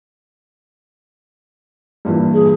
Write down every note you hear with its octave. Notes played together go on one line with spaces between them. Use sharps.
G2 A#2 E3
G#4